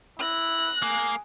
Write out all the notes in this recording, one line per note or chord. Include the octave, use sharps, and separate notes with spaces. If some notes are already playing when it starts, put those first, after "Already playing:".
E4 F#6 A#6
A#3 G#4